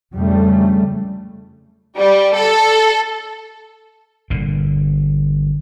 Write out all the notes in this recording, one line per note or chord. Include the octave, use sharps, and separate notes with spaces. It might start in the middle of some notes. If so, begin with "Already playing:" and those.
F2 C#3 G3 A3
G3
A4
G1 A#2 D3